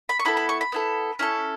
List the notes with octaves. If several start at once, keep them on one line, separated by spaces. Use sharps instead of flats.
B5
C#6
B3 E4 A4 B5
B5
C#6
B5
B3 E4 A4
C#4 E4 A4